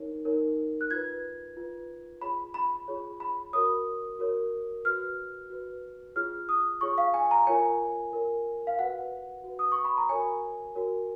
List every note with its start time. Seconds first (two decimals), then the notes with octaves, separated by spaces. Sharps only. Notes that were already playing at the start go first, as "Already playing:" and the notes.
Already playing: D#4 A#4 C#5
0.25 D#4 A#4 C#5
0.81 F#6
0.91 F4 B4 G#6
1.57 F4 B4
2.21 F4 G#4 C#5 B5
2.54 B5
2.88 F4 G#4 C#5
3.20 B5
3.53 F#4 A#4 C#5 D#6
4.19 F#4 A#4 C#5
4.84 F#4 B4 F6
5.50 F#4 B4
6.16 F4 G#4 C#5 F6
6.49 D#6
6.81 F4 G#4 C#5 C#6
6.98 F5
7.14 G#5
7.31 A#5
7.47 F4 A#4 C#5 G#5
8.13 F4 A#4 C#5
8.67 F5
8.78 F#4 B4 F#5
9.44 F#4 B4
9.59 D#6
9.72 C#6
9.85 B5
9.97 A#5
10.09 F#4 A#4 C#5 G#5
10.75 F#4 A#4 C#5